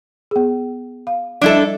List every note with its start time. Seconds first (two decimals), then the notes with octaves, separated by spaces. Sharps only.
0.31 B3 G#4
1.07 F5
1.42 F3 G3 D4 E4 A4 D#5